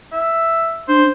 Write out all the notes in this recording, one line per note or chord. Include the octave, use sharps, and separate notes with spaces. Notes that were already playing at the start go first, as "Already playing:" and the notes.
E5
D4 C5